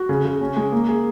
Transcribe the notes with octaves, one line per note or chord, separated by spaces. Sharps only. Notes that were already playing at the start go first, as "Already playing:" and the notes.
Already playing: F#4
C#3
C#3
C#4
G#3
A#3
G#4